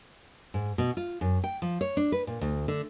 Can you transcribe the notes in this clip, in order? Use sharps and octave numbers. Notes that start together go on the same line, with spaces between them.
G#2
B2
F4
F#2
G5
F3
C#5
D4
B4
A#2
D2
D3